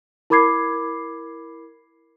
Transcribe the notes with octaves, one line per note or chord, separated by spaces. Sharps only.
E4 A#4 B5 D6 G#6 C7